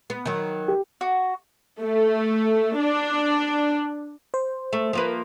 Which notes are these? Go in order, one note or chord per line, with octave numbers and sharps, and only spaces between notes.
B3
D#3 F#3
G4
F#4
A3
D4
C5
A3
F3 A#3 B4